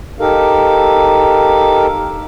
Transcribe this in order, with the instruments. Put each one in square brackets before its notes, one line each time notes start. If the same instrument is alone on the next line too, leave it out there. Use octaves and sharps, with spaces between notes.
[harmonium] D#4 G4 A4 A#4 F5